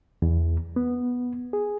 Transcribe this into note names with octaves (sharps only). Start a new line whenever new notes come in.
E2
B3
G#4